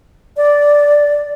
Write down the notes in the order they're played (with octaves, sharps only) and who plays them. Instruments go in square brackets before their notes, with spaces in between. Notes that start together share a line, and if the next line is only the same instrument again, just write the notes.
[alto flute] D5